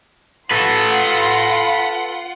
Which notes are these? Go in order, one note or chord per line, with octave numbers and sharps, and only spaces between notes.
F4 A4 B4 F#5 C6